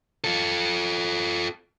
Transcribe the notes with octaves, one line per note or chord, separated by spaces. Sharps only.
F4 A4